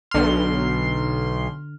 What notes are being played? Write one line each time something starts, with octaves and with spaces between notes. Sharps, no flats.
B1 D3 C6 F6